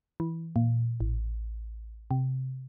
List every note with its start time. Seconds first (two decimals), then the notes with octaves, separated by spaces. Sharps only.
0.20 E3
0.56 A#2
1.00 A1
2.11 C3